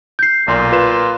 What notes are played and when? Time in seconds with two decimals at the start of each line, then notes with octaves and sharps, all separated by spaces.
0.19 G6 C7
0.48 B1 A#2 C6
0.72 F4 B4 E7